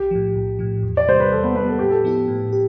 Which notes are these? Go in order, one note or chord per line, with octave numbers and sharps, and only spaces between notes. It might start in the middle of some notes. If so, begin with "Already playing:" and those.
Already playing: B1 G4
A2 F3
B1
A2 F3
E2
D5
C3 G3 C5
B4
E2 A4
B3 B4
C3 G3 B3 B4
A4
A2 G4
A4
F3 B3 E4 G4
A2
G4